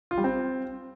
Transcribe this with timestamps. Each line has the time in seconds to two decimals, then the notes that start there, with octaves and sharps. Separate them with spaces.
0.11 F4
0.18 G3
0.24 C4